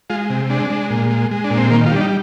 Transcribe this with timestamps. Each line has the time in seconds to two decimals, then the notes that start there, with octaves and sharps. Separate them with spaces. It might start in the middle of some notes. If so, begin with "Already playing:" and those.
0.10 G#3 F4
0.30 C3
0.50 G#3 D4
0.70 G#3
0.90 A#2
1.11 G#3
1.31 G#3
1.44 D4
1.51 A#2
1.57 C4
1.71 D#3 A#3
1.86 F4
1.91 G3 D4
2.01 D#4